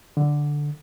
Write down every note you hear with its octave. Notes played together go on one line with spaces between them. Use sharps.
D3